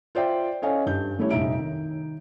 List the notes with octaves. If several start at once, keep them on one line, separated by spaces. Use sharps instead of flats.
F4 C5 D5 E5 G5
C#4 A4 C#5 D#5 F5 G#5
G2 G6
G3 A3 C#4 E4 C#5
F1 A#1 G3 D#4 E5 D7
D#3